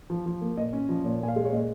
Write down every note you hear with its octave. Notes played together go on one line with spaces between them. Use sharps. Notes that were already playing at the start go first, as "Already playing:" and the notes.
F3
F3
A#3
A#2 D#5
C#4
F3
A#2 C#5
A#2 G#5
F5
G#3
C#5
A#2 D#5